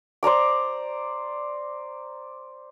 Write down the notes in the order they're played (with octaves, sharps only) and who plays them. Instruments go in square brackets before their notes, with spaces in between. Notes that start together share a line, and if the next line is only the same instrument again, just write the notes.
[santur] C5 D5 A#5 D6